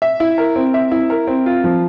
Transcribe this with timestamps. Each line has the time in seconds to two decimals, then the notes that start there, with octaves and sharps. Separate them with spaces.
0.02 E5
0.20 E4
0.38 A#4
0.56 C4
0.74 E5
0.91 E4
1.10 A#4
1.27 C4
1.46 F4
1.64 F3